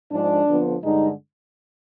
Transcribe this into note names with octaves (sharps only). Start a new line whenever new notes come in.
G#2 F3 G#3 D4
F2 D3 F3 B3
G2 D3 G#3 D#4